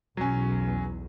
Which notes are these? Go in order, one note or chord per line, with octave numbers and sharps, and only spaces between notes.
B1 E2 F#3 C#4